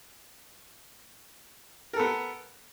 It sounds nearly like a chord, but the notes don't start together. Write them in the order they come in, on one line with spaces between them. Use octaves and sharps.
A#4 A4 B3